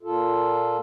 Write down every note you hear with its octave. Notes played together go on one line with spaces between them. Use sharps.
A#2 F4 A4